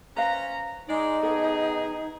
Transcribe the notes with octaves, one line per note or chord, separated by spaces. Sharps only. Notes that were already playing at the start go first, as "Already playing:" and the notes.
C#4 B4 C5 F5 A#5
G#3 D#4 D5
D#3 B3 G#4 A4 C#5